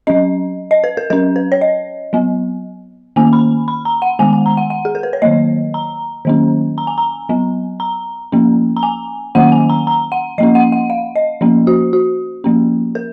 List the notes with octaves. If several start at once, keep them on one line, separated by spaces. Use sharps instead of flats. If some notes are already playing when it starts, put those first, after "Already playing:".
F#3 C#4 D#5
D#5
B4
A#4
F#3 C#4 A#4
B4
C#5
D#5
F#3 B3
D#3 A#3 C#4 G#5
B5
B5
A#5
F#5
D#3 G#3 B3 G#5
G#5
A#5
F#5
F#5
G#4
A#4
B4
C#5
D#3 F#3 A#3 D#5
A#5
D#3 F#3 A#3 C#4
A#5
G#5
A#5
F#3 B3
A#5
F3 A#3 C#4
A#5
G#5
D#3 F#3 A#3 C#4 F#5
G#5
A#5
A#5
F#5
F3 A#3 C#4 D#5
F#5
F#5
F5
D#5
F3 A#3 C#4
F#4
F#4
F3 A#3 C#4
A#4